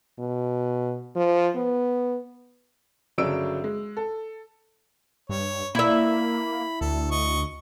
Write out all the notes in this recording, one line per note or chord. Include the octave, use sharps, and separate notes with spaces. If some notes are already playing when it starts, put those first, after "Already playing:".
B2
F3
B3
G1 C#3 F#3 D4 E6 D7
G#3
A4
G2 C#5
A#3 E4 E5 B5
D2 A4
D#5 C#6